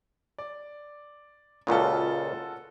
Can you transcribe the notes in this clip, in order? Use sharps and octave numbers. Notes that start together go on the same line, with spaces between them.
D5
C#2 A#2 C#3 F4 F#4 A4